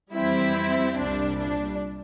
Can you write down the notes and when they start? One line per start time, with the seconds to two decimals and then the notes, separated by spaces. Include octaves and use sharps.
0.13 F2 E3 G3 C4 E4
0.97 C2 A#2 G3 D4
1.39 D4